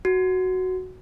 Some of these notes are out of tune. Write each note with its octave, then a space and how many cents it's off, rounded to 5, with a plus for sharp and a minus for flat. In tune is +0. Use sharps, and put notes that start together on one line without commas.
F#4 +5